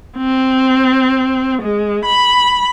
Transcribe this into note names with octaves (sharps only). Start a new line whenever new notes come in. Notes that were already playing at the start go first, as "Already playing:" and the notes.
C4
G#3
B5